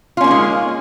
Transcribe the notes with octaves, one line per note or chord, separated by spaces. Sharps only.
G#3 A#3 C#4 D#4 F4